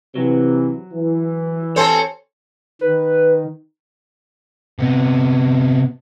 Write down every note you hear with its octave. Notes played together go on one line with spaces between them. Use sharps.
C3 E3 F#3
E3
C4 A4 C5 C#5 G#5 A5
D#3 B4
C3 B3